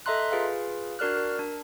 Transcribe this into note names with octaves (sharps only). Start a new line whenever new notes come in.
A4 D#5 E5 A#5 C6 F#6
F4 G#4 B4 F5
D4 F#4 A#4 D5 F6 F#6
A#4
D4